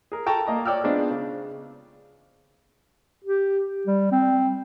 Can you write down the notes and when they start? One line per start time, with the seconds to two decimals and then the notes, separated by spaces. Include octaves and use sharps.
0.12 G#4 A#4
0.26 A4 G5 A5 A#5 C#6
0.47 A#3 D#5 A#5
0.65 C#5 D5 G5 E6 F6
0.84 G#3 B3 C4 D4 D#4 F4
1.10 C#3
3.24 G4
3.87 G3
4.12 C4